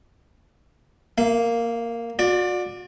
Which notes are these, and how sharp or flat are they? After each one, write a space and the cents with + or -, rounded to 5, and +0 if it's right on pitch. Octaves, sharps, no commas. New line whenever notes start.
A#3 -5 E5 +40
F#4 -40 D5 +10